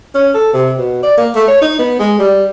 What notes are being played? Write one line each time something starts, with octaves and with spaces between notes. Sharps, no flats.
C#4
A4
C3
B2
D5
A#3
A3
C#5
D#4
B3
G#3
G3